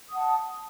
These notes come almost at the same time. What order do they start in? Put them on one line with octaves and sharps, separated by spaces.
D#6 F#5 A5